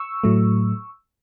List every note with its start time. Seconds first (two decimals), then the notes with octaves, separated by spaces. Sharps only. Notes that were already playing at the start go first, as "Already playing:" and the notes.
Already playing: C#6 E6
0.24 A2 F#3 A3